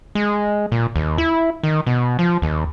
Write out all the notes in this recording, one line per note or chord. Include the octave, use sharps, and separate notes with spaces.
G#3
A#2
D#2
E4
D#3
B2
F3
D#2